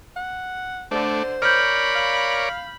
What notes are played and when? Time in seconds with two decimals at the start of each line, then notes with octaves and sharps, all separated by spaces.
0.17 F#5
0.91 D3 A3 D4 C5
1.42 A#4 C#5 D5 B5 F6 G6
1.95 F5